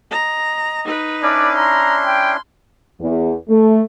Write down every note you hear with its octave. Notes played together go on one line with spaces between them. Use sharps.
D#5 A#5
D#4 B4
C#4 D4 E4 D5
A#5 C6
G5
E2
A3